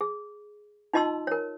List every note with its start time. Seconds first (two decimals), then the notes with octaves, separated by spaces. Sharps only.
0.01 G#4
0.93 D#4 F4 D#5 A5 C6 E6
1.27 A#4 C#5